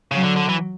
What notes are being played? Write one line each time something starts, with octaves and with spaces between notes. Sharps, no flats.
C#3 F#3
D3
D3
E3